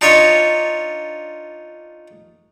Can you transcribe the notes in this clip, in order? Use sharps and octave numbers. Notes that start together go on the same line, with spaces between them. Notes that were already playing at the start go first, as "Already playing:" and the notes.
D4 D#4 F4 C#5